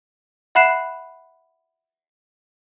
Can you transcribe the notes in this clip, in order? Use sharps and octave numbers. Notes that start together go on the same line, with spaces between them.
E5 F#5 B5 F#6 C7 E7